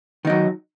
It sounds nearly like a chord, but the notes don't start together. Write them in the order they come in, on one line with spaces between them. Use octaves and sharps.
D#3 D#4 F#3